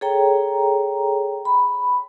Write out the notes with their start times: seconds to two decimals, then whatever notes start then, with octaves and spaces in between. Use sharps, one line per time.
0.01 G#4 A4 C#5 G5 A#5
1.45 B5